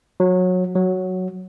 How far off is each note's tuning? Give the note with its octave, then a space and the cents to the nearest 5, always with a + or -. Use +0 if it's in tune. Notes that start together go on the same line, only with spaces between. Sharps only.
F#3 -20
F#3 +0